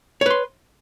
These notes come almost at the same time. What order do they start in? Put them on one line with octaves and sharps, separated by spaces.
C#5 B4 C6